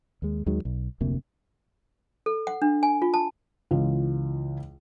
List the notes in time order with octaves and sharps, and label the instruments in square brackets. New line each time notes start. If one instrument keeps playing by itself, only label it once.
[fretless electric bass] D#2 G#3
D#2 D#3 F#3 G#3
B1
F1 D2 C3 A#3
[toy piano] A4
F#5
D4
G#5
F4
A5
[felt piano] C#2 E3 F4